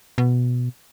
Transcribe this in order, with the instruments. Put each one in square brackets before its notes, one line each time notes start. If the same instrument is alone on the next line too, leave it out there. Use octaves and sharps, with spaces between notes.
[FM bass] B2